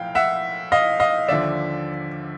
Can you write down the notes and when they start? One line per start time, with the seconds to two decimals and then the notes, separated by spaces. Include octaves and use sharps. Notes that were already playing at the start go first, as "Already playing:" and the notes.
Already playing: B1 A2 F3 F5 G5
0.15 E5 F#5
0.72 D#5 F5
1.00 D#5 F5
1.28 D#2 D3 F3 D5 E5